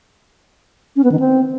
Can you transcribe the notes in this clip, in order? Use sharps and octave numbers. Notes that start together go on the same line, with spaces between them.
C#4
B3
D#3
C4